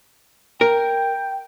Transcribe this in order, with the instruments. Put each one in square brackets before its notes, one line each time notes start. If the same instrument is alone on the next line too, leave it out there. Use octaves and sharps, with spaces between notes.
[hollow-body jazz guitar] A#4 [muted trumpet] G5